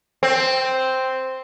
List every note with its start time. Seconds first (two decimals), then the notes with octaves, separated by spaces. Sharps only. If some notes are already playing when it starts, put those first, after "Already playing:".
0.23 C4